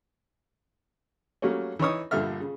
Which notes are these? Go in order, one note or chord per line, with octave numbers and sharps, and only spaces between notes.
F#3 G3 A3 A#3 C#4
E3 D#4 C#5 D#6
A#1 G2 D3 E5 F6
C#3